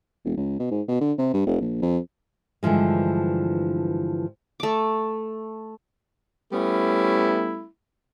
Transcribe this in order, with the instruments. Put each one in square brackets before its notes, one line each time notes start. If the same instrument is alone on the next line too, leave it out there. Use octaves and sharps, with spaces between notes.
[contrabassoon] E1
C#2
B2
G#2
B2
D3
C3
G2
F1
A#1
F2
[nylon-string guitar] G2 D3 E3 F3 G#3
[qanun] A3 D6
[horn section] G3 A3 B3 C#4 E4